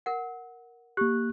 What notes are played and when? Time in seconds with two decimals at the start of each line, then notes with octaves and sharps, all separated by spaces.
0.06 A#4 F#5
0.97 A#3 G4 F#6